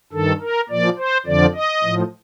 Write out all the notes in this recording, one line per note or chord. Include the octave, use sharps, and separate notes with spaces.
G2 D#3 A4
A#4
A#2 F3 D5
C5
F2 D3 F3 D5
D#5
A2 F3